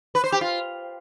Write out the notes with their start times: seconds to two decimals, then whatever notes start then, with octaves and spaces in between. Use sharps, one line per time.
0.15 B4
0.24 C5
0.32 G4
0.41 F4